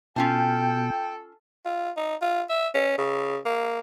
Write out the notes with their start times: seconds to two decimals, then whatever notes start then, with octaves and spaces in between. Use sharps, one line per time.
0.16 B2 C#4 F4 A4 G5 A5
1.66 F4
1.97 D#4
2.22 F4
2.49 E5
2.75 C#4
2.98 C#3
3.46 A#3